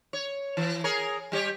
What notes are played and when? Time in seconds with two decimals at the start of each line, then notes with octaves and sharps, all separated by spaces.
0.13 C#5
0.57 E3
0.84 G#4 A#4 C#5
1.32 G3 G4 C#5